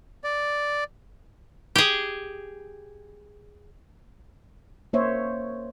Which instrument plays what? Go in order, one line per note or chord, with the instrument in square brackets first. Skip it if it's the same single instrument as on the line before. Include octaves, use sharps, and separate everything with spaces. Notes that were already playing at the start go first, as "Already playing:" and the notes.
[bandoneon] D5
[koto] G4 G#4
[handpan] A#3 C5 C#5 E5